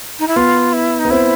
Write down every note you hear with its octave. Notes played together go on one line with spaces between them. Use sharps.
D#4
E4
B3 F4
E4
D#4
B3
C4 E4